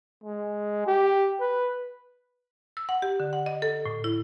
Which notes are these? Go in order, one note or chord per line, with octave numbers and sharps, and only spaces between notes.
G#3
G4
B4
E6
F#5
G4
D3
F#5
D#5
A4
A2
E4